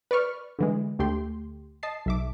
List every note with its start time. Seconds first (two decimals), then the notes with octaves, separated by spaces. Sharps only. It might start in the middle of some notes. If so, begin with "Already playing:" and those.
0.11 B4 D5 C#6 F6
0.59 D3 E3 G#3
0.99 D2 A3 G4 C6
1.83 D#5 A5 C7
2.06 B1 E5 D6